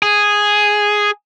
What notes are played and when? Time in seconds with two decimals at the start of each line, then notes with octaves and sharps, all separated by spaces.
0.03 G#4